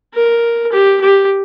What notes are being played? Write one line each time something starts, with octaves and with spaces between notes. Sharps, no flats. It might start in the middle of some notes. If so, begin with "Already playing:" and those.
A#4
G4
G4